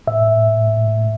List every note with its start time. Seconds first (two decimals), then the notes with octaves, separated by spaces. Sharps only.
0.07 A2 E5
0.27 A2
0.48 A2
0.68 A2
0.87 A2